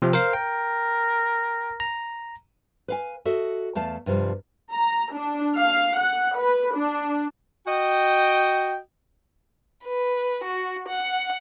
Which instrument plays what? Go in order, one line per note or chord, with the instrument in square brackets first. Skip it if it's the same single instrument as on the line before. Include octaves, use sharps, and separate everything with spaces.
[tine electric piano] C3 F3 C4
A#4 C5 F5
[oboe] A#4 [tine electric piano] G5
[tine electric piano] A#5
[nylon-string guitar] B4 F5 G#5
F#4 A4 D#5 E5
E2 A3 F5 A5
G2 C3 F3 G3
[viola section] A#5
D4
F5
F#5
B4
D4
[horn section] F#4 D#5 G5
[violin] B4
F#4
F#5